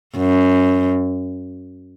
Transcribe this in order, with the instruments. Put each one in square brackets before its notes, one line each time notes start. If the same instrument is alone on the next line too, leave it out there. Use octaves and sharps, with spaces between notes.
[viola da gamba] F#2